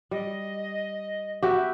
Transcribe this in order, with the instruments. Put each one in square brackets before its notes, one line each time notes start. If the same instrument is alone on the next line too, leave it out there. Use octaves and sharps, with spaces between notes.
[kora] G3 [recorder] D#5
[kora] B3 F#4 G4 [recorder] E5